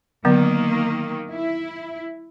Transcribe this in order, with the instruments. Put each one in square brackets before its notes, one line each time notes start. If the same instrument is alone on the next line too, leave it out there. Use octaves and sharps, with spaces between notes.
[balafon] D3 F#3 B3 [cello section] D#3 A#3
[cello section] E4